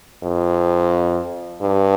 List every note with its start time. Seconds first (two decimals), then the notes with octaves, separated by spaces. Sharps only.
0.23 F2
1.63 G2